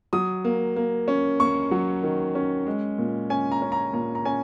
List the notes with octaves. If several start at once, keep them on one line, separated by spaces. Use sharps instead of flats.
F#3 D#6
A#3
A#3
C#4
A#3 C#6
F#3
D#3
C#4
G#3
A#2
C#4 G#5
A#5
C#4
A#5
A#2 A#5
A#5
C#4 G#5